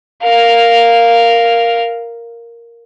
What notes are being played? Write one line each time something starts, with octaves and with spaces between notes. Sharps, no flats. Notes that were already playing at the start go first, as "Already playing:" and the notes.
A#4 F5